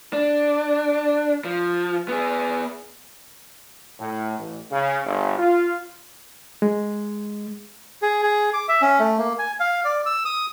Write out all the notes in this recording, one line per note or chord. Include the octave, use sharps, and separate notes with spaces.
D4
F3
B3 G#4
A2
A1
C#3
G1
F4
G#3
G#4
G#4
D6
E5
C#4
A3
A#3
G#5
F5
D5
E6
D#6